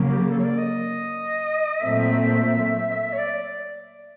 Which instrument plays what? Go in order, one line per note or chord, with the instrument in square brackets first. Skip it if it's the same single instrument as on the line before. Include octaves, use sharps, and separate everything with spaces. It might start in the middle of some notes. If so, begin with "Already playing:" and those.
Already playing: [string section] C#3 F#3 A#3
[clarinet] G4
G#4
A4
C#5
D5
D#5
[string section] A#2 F#3 A3 C4 [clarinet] E5
[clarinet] E5
C#5
D5